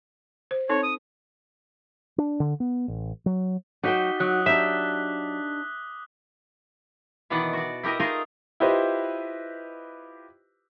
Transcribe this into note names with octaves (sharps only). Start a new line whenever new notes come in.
C5
C4 D#4 A4 C#5
D#6
D4
D3
B3
A1
F#3
F#3 D#4 F#4 G5 D6 B6 G7
F#3 D#6 F#6
D4 D#4 G4 E5
B2 D#3 E3 B3 D5 F#5
F#4 D5
E4 G4 A#4 D#5
A3 D#4 F4 G#4 A#4 D#5
E4 F4 G4 B4 C5 D#5